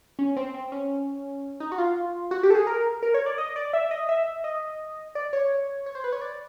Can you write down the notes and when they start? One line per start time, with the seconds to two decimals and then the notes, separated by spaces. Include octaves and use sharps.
0.19 C#4
0.37 C4
0.54 C4
0.72 C#4
1.60 D#4
1.72 F#4
1.78 F4
2.31 F#4
2.43 G4
2.50 A4
2.55 G#4
2.67 A#4
3.03 A#4
3.14 C#5
3.26 D5
3.38 D#5
3.56 D5
3.73 E5
3.91 D#5
4.09 E5
4.44 D#5
5.15 D5
5.33 C#5
5.86 C#5
5.95 C5
6.04 B4
6.13 C#5
6.22 D5